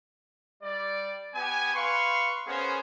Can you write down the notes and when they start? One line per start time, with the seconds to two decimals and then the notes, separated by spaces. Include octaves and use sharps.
0.63 G3 D5
1.35 B3 G4 G#5
1.74 B4 F5 C6 C#6
2.47 B3 C#4 G#4 A#4 C5